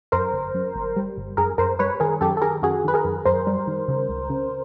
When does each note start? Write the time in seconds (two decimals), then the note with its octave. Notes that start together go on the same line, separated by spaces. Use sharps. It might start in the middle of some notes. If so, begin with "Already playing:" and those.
0.12 F#2 A#4 C5
0.33 G1
0.54 F#2
0.75 G1
0.97 G3
1.17 G1
1.37 F#2 G#4 A#4
1.58 F#2 A#4 C5
1.79 G3 B4 C#5
2.00 D#3 G#4 A#4
2.21 F#2 G4 A4
2.37 A4
2.42 D#3 G#4 A#4
2.62 F#2 F#4 G#4
2.84 D#3 B4
2.94 G#4 A#4
3.05 F#2
3.25 F#2 A#4 C5
3.47 G3
3.67 D#3
3.88 C#3
4.09 C#2
4.30 C#3